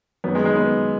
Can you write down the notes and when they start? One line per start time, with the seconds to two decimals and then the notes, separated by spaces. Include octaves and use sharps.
0.24 F#2 D#3 B3
0.35 G#3
0.46 G#3
0.56 B3